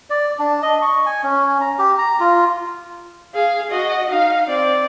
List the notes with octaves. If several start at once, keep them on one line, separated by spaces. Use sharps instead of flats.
D5
D4
D#5
C#6
G#5
C#4
A#5
G4
A#5
F4
G#4 F5
F#4 D#5
D#4 F5
C4 D5